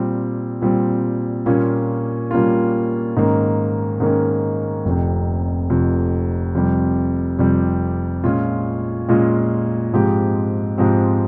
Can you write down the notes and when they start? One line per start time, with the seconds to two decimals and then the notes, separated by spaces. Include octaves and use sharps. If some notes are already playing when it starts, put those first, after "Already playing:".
Already playing: A#2 G3 C4
0.62 A#2 G3 C4
1.46 A#2 G3 A#3 C#4 F4
2.31 A#2 G3 A#3 C#4 F4
3.16 G#2 D#3 A#3 C#4
4.00 G#2 D#3 A#3 C#4
4.85 F1 F2 C3
5.70 F1 F2 C3
6.55 F2 C3 G3
7.39 F2 C3 G3
8.24 A#2 G#3 C#4 F4
9.09 A#2 G#3 C#4 F4
9.93 G#2 F3 G#3 C4 G4
10.78 G#2 F3 G#3 C4 G4